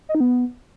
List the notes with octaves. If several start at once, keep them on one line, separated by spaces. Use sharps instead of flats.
D#5
D#4
B3